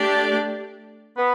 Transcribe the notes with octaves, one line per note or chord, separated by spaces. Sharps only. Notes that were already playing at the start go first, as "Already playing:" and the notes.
Already playing: A3 D4 G4 D5
B3